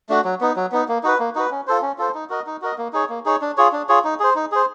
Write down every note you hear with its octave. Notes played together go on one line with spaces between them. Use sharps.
A3 D4 F#4
F#3
B3 D#4
F#3
B3 D#4
A#3
D#4 F#4 B4
A#3
D#4 F#4 B4
C#4
F4 A4 C5
C#4
F4 A4 C5
D#4
F#4 A#4 D#5
D#4
F#4 A#4 D#5
A#3
D#4 G#4 C#5
A#3
D#4 G#4 C#5
D4
F4 G#4 C#5
D4
F4 G#4 C#5
D#4
G#4 C5
D#4
G#4 C5